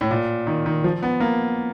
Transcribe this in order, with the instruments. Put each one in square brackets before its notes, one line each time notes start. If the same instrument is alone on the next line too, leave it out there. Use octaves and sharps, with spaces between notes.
[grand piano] A2
A#2
D#3
D#3
F3
B3
A#3